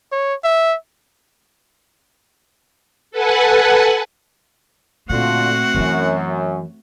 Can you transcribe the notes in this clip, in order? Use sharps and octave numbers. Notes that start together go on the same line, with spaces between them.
C#5
E5
A4 B4 F#5 G#5 A5
A#2 D3 A3 C4 F4 F#4 F#5
F#2 E3 E4